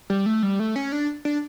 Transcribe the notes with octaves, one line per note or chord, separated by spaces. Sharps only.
G3
A3
G3
A3
C#4
D4
D4